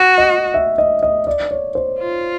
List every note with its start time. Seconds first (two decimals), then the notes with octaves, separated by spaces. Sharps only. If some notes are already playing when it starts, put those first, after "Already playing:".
Already playing: F#4
0.18 D#5
0.54 E5
0.78 D#5
1.03 D#5
1.27 D5
1.51 C#5
1.75 C5
1.99 F4